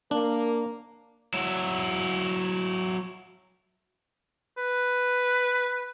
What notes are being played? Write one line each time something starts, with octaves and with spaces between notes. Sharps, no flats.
A#3 D4
F#3 E4
B4